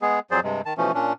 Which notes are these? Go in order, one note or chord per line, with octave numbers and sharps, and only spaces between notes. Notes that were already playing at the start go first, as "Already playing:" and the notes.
G#3 B3 G#4
F2 F#3 G#4 C5 D5
G2 C3 G#3
D#3 A5
B2 E3 F3 A3 C#4
A#2 C#4 D4